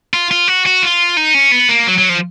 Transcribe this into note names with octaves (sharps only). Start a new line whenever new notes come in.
F4
F4
F#4
F#4
F4
D#4
C#4
B3
A#3
F#3
F#3
F3